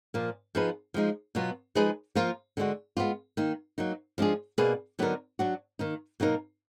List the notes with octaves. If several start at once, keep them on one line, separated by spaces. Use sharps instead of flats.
A#2 F3 A#3
F3 B3 D#4 G#4 B4
F3 G#3 D#4
B2 F#3 B3 F4
F3 G#3 D#4 G#4 B4
F3 A#3 F4 A#4
D3 G#3 D4 F#4
G#3 B3 D4 F4
D#3 A#3 D#4
F#3 A#3 D#4
F3 G#3 D4 G#4
B2 A#3 D4 G#4 B4
D3 F#3 B3 D#4 A#4
F#3 D4 F#4
D#3 A#3 D#4
B2 F#3 A#3 D#4 A#4